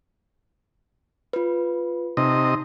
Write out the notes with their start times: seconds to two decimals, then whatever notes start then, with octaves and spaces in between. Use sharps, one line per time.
1.33 F4 B4
2.17 C3 D#4 D#5